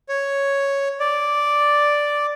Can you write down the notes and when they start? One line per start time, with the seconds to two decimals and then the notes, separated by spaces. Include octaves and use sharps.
0.09 C#5
1.00 D5